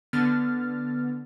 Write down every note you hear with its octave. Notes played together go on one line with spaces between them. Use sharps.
D3 B3 F6 A6